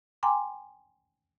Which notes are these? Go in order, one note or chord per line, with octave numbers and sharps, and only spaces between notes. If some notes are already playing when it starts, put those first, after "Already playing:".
G5 G#5 A#5 C6 D6